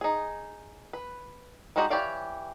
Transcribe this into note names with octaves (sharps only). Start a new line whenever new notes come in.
D#4 G#4
B4
G3 G#3 D#4 F#4 G4
E3 G4 C#5 D5 F5